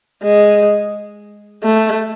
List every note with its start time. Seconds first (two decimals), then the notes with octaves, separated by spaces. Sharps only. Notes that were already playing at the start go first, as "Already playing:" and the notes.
0.23 G#3
1.63 A3